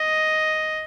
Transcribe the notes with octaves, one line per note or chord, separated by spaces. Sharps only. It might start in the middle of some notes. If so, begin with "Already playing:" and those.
Already playing: D#5